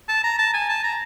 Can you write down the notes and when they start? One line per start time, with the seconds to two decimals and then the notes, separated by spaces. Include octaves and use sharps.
0.09 A5
0.24 A#5
0.39 A5
0.54 G#5
0.69 A5
0.83 A#5